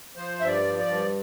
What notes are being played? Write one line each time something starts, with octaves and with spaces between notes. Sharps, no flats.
F3 C5
G2 E5
D5
F3
D5
G2